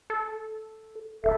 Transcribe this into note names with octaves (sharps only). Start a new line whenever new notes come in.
A4
D1 A4 E5